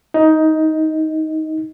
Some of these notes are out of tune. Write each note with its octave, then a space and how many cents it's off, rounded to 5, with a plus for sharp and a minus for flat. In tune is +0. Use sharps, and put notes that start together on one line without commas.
D#4 +15